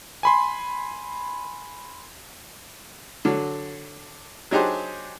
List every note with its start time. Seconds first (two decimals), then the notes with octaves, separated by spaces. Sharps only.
0.23 G#5 B5 C6
3.25 D3 F#3
4.51 F#3 D4 D#4 G4 G#4 C5